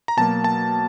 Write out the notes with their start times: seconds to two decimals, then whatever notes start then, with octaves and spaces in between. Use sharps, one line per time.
0.08 A#5
0.17 B2 F#3 A#3 A5
0.44 A5